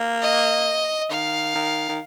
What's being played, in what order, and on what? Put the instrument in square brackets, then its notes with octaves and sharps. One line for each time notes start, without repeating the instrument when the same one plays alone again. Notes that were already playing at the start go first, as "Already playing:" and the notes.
Already playing: [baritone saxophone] A#3
[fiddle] D#5
[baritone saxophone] D#3 [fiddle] F5
[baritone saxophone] D#3
D#3